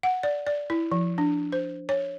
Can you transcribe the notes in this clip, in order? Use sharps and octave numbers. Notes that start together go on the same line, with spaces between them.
F#5
D5
D5
E4
F3
D4
C5
C#5